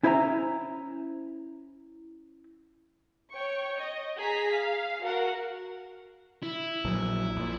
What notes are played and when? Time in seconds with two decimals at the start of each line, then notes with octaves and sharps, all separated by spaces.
0.03 C#4 E4 C5 E5 G#5 A#5
3.34 C#5 G5 C#6
3.77 D#5
4.19 G#4 A#5 B6
4.54 F5
5.04 F#4 A#4 F#5
6.43 E4
6.85 A#1 F#3
7.36 A#1 A#2